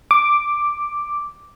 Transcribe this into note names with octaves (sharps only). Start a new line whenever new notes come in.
D6